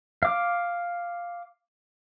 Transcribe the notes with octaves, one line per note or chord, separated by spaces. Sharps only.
F5 D6